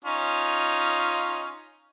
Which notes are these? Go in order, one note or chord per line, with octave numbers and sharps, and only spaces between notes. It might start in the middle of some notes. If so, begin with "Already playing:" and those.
C#4 D#4 F4